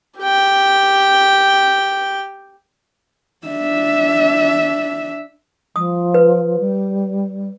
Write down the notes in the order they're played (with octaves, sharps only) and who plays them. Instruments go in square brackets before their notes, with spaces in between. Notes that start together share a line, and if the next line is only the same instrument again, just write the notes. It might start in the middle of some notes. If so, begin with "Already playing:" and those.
[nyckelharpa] G4 G5
[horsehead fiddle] D4 E5
[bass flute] F3 [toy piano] D#6
[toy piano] B4
[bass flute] G3